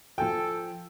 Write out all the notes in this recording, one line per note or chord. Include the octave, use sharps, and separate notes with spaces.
F3 A4 G5 G#5 E6